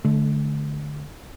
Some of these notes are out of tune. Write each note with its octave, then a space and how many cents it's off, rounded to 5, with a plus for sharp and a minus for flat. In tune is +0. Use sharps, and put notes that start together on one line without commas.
D3 +0 A3 -30